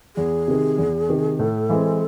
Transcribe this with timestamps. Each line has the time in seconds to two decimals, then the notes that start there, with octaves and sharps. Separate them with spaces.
0.16 E2 G#4
0.48 C3 D#3
0.78 E2
1.09 C3 D#3
1.39 A2 A4
1.69 E3 G#3 C4